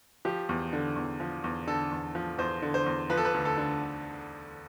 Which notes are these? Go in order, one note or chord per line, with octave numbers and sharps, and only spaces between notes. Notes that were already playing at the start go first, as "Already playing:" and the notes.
F3 G4
E2
D3
E2
F3
E2
D3 A4
E2
F3
E2 C5
D3
C5
E2
F3 B4
A4
B4
D2
A4
D3